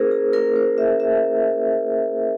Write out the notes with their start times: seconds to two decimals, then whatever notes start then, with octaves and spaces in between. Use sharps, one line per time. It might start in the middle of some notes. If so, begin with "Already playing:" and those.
Already playing: A#3 C#4 E4 G#4 A#4 C5
0.11 G#4
0.33 A#3 C#4 E4 A#4
0.56 C5
0.78 E5
1.00 E5